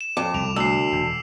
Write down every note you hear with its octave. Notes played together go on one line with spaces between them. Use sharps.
E7
F2 D6
C2 D7 F7
D2 E6 C7
E1